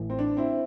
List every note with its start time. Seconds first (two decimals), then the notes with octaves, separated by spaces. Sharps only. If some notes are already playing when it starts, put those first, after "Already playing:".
Already playing: A1 A2 E3
0.10 C4
0.19 D4
0.37 C4 E4